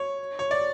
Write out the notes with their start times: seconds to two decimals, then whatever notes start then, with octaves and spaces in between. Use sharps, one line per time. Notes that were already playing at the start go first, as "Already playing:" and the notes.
Already playing: C#5
0.39 C#5
0.51 D5